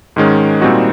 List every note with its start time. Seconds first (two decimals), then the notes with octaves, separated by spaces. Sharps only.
0.16 G#2 D#3 G#3 C#4
0.61 A#2 G3 C4 D#4 F#4